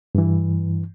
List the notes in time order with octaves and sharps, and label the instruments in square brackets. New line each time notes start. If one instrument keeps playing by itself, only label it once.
[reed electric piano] G2 E3